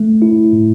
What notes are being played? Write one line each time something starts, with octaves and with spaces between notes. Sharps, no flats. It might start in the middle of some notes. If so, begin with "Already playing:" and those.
Already playing: A3
E4
A2